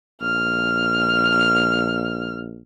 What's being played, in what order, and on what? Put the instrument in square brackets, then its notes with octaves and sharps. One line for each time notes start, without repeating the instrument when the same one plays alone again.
[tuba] A#1 [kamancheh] F6